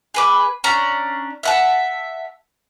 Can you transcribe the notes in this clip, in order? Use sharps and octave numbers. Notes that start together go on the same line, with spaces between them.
G#4 B4 D6
C#4 D4 A#5
E5 F#5 A5